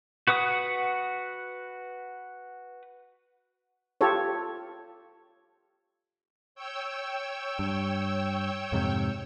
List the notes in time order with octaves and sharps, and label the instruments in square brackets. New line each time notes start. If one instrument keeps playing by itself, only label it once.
[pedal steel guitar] F#4 B4 F#5 D#6
[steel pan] F4 G4 A4 C#5
[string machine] C#5 G5 E6
[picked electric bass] G2
F2 G#2 C3